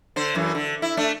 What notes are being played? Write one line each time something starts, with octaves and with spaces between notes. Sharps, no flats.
D3 C5
F#2 E3
D3
E4
A3 D4